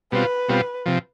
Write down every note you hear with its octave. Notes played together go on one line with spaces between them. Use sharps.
B2 G3 C4 F4 B4
B2 G3 C4 F4
C3 F3